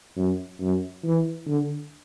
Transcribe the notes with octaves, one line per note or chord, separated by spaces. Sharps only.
F#2
F#2
E3
D3